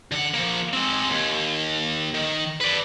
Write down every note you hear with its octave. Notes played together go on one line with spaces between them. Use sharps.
D3 F#5
F3 A#3
G#3 C4
D#2
D#3
B4 D5